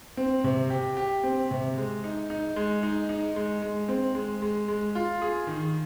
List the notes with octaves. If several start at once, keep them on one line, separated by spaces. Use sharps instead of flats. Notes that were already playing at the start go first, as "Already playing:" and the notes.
C4
C3
G4
G4
C4
C3
G#3
D#4
D#4
G#3
D#4
D#4
G#3
G#3
C4
G#3
G#3
G#3
F4
G#4
D#3